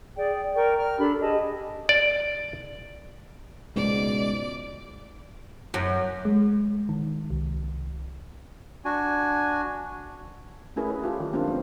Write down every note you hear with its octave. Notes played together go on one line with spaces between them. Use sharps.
G#4 D5 G5
A#4 D5 G5 C#6
F6
D4 G4 A4 B5
G4 G#4 D#5 A5
D5
C#2 G#2 B2 D5
F#2
G#3
D#3
C2
D4 F#4 G#5
A3 C#4 E4 G#4 A#4 B4
B4
F4 G4 A4
D#3 F#3
A#3 C4 D4 F4
F#3 B3 C5